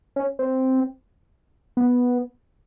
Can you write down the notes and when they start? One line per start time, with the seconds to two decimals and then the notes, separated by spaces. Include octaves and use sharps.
0.16 C#4
0.39 C4
1.77 B3